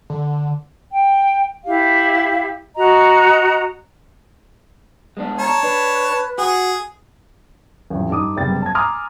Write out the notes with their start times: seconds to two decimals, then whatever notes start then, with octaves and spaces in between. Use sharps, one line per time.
0.10 D3
0.91 G5
1.66 E4 G4 F5
2.76 F#4 D#5 A#5
5.17 G#3 B3 D4
5.39 C#5 A5 A#5
5.63 D4 B4
6.38 F#4 G#4
7.90 A1 F2
8.10 G2 D#4 D6 D#6
8.36 F#1 C3 G3 B3 A6
8.62 A5 G#6
8.75 G#5 A#5 C6 D6 D#6 F6